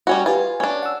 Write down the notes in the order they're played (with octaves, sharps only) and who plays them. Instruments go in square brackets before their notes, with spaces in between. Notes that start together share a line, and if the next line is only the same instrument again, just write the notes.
[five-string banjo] G3 C#4 F#4
[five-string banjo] F4 [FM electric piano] G4 B4 G#5
[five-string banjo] C#4 D4
[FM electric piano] F#5 E6